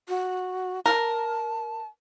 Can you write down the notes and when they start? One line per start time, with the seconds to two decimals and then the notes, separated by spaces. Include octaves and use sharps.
0.09 F#4
0.86 A#4 A5